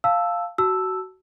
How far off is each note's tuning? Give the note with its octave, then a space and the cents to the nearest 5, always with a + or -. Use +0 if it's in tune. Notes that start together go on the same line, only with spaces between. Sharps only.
F5 +0 A5 +0 E6 +0
F#4 +20 A5 +0 E6 +0